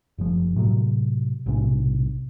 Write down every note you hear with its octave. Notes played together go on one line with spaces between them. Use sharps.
F#1 F3
A2 C3 F#3
B1 A2 C3 C#4